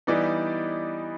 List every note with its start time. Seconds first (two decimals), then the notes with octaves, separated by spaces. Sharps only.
0.07 E3 G3 B3 D#4 D5